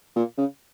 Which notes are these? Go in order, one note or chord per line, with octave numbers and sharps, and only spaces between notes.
A#2
C#3